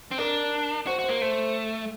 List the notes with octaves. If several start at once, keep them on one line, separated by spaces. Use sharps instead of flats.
C4
D4 A#4
F#4 C5
F#4
C5
A#3
A3 C5